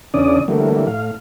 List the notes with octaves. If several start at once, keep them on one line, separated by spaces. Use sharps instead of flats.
E2 C#3 C#4 D4 D5 D#6
D3 E3 F#3 G3 A3 A#3
A2 F5